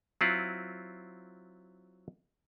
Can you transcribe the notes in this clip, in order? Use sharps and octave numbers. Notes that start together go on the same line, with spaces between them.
F#3 C4 E4 F4 F#5